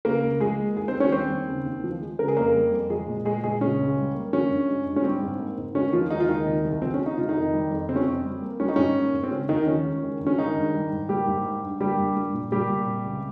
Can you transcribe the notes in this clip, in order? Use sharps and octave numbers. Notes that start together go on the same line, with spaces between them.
C#3 A#3 A#4
C#2
F3 G#3 G#4
A#3
D#3 G#3 G#4
C4 C5
D#2
C#4 C#5
G3 C4 C5
D#2
C#3
D#2
F3
G#3
C#3 A#4
G#4
F2 A#3 A#4
G3
F2
F3 G#3 G#4
A#2
G#3 G#4
A#2 G#3 G#4
C#3 C#4
C#2
G3
A#3
F3 C#4
G2
G#3
G2
C#4
G3 C4
G#2
A#3
G#2
D#3 C#4
D#2 F3 F4
G#3 D#4
F4
D#2 D#3 D#4
C3
C2
F3 C4
C#4
G#3
D#4
C3 F4
D#3 D#4
F2
G3
F2
C3 C4
C#4
F2 C4
G3
A#3
G3 C#4
D#4
G#2 C#4
A#3
G#2
C4
C#3 C#4
D#2 D#3 D#4
F3 C#4
G#3
D#3
G2
C#4
D#3 G#3 D#4
G2
G3
G#2
G3 A#3 G4
G#2
G3
G2
G3 A#3 G4
G2
G3
A#2
G3 A#3 G4
A#2
C3
C#2